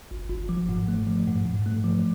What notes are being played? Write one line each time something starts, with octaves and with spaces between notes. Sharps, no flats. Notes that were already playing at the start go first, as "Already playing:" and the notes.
G1
G1
F3
G#2
A3
F3
G#2
G#2
A3
F3